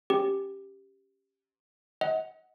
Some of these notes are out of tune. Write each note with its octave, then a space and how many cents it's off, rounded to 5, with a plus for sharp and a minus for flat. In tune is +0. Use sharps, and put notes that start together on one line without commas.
C#4 +0 G4 +0
D#5 +35 F#5 +0